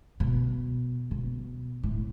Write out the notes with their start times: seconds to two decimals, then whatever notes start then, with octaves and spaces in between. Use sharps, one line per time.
0.20 B2
1.11 B2
1.83 A2